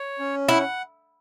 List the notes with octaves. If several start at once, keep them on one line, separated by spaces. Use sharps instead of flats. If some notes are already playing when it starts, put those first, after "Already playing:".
Already playing: C#5
C#4
E4 F#5